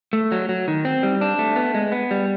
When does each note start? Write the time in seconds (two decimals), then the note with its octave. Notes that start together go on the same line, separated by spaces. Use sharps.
0.13 A3
0.32 F#3
0.49 F#3
0.68 D#3
0.85 C4
1.03 G3
1.21 D4
1.39 A3
1.56 B3
1.74 G#3
1.92 B3
2.11 G3